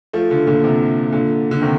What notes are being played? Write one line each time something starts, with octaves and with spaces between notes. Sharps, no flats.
F3 A3
D3 F3
A#2 D3
C3
A#2 D3
D3
C3 D#3